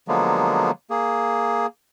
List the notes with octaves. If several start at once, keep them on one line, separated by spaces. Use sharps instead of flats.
D3 F3 F#3 G#3 A#3 B3
A#3 G#4